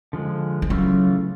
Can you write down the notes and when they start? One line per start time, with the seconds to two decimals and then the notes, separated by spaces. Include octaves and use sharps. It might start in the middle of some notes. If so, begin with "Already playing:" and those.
0.13 D3 F3 G#3
0.62 F3
0.70 C#3 E3 F#3 A3 C#4 F4